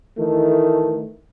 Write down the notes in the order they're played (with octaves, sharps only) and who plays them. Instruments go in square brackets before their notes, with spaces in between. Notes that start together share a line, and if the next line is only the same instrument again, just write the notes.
[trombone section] D#3 E3 A3